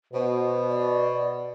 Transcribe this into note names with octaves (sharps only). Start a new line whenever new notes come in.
B2 C5
D5